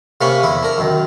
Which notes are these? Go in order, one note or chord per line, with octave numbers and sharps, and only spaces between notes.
C3 A#3 C#4 F5 B5 C#6
E2 E4
D4 A#4
F#2 D#3